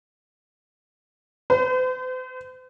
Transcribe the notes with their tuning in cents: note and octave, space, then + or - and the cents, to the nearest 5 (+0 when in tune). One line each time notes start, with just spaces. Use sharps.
C5 -45